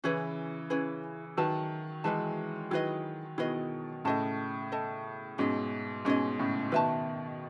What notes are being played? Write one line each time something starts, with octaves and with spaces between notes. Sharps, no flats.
C#3 E3 C#4 E4 G#4 B4
C#4 E4 G#4 B4
D#3 F#3 G#4 B4 E5 A5
E3 G#3 G#4 B4 E5 A5
D#3 F#3 E4 G#4 B4 D#5
B2 D#3 E4 G#4 B4 D#5
A2 C#3 A4 D#5 A5
A4 D#5 A5
G#2 B2 C#4 G#4 D#5
G#2 B2 C#4 G#4 D#5
A2 C#3
B2 D#3 B4 E5 A5